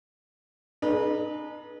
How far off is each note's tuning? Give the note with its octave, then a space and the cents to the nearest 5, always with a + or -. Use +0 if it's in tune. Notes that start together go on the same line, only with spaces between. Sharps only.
D#4 -35 G#4 +30 B4 -30